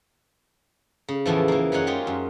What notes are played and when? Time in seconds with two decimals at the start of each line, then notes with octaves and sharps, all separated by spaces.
1.08 C#3
1.26 E2 A2 E3 F3
1.48 E3 A#3
1.72 F#2 C#4 D#4 G#4 C#5 F#5
1.87 G#3 F4 G4 G#4
2.07 F#2